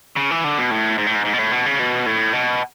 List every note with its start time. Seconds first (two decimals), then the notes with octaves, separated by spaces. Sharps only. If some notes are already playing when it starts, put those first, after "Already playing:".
0.16 C#3
0.31 E3
0.44 D3
0.58 B2
0.71 A2
0.98 G#2
1.06 A2
1.15 G#2
1.25 G#2
1.33 B2
1.39 A2
1.52 B2
1.66 C#3
1.79 B2
2.06 A2
2.33 B2